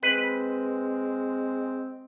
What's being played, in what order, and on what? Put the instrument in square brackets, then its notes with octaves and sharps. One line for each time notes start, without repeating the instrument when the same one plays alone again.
[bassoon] G#3 [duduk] C4 [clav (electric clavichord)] B4